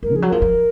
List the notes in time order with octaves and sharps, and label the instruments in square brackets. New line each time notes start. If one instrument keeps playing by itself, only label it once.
[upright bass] G#2 [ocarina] A#4
[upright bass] F3 [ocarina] G#4
[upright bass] F#3
[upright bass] F3 [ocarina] A#4
[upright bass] F3